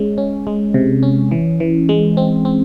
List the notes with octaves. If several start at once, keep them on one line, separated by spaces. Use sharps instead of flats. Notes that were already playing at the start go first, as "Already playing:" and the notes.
Already playing: G#3 C#4
C#4
G#3
C3
C#4
E3
E3
G#3
C4
C4